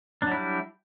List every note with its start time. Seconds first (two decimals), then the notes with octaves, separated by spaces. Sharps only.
0.22 D4
0.27 F#3
0.32 E4
0.36 G3